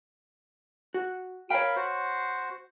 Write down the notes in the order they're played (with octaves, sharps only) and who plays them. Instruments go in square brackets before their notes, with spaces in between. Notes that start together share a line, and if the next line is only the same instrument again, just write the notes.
[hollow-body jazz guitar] F#4
[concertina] A#4 F5 B5 [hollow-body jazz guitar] C#5 G5
[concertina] F#4 C5